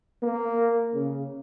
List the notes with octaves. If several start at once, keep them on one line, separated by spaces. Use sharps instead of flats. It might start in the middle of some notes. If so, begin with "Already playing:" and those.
A#3
C#3